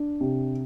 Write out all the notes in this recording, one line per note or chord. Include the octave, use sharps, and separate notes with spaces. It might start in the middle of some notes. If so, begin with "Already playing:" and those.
Already playing: D4
C3